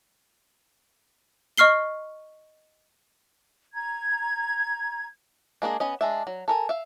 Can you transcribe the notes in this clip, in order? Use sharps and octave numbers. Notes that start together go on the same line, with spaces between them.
D#5 C#6 F6 C7 G7
A#5 G#6
G#3 A#3 D4 G#4
B3 C#4 D#5
G#3 D4 E5
F#3
A4 A#4 G#5
E5 F5